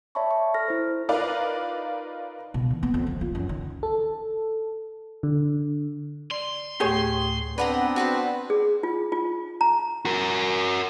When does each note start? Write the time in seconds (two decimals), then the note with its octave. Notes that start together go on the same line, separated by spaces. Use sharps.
0.15 C#5 D5 E5 A5 B5 C#6
0.31 C#6
0.54 A4 F6 A#6
0.68 E4 C5
1.09 D#4 F4 A#4 B4 D5 F5
2.54 B2
2.71 E3
2.83 B3
2.94 F2
3.07 F3
3.21 F4
3.35 F#2
3.49 D#3
3.83 A4
5.23 D3
6.31 D5 C6
6.80 D2 A2 A3 G4 G#4 C#5
7.58 B3 C4 D4 B4 F#5 A#5
7.96 F#4 B4 C5
8.50 G#4
8.83 F4
9.12 F4
9.61 A#5
10.05 F#4 A#4